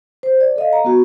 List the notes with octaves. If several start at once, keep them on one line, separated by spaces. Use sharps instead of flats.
C5
D5
A4 D#5 F5
A#5
B3 F#4